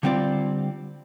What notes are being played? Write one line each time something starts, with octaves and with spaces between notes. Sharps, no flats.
D3 G3 C4 F4 D5